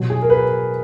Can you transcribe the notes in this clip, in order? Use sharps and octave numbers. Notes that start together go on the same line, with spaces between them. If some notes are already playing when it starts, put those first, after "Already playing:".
Already playing: B2 F#3
G#4
A#4
B4